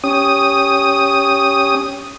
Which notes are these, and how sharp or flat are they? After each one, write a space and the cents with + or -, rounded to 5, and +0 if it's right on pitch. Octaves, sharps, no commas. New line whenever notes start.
C#4 +5 G4 +5 D#6 +0